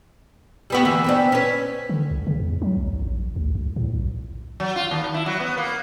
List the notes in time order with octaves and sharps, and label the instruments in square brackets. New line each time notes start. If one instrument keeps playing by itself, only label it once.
[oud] G3 B3 F#4
D3 E3 A#3
B3 C4 D4
C#4 B4
[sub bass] D3
C2
C#3
E2
F#3
B1
A#1
A#1
D2
C#2
A2
B1
[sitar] F#3
F4
D#2
E4
F#3
B3
A#3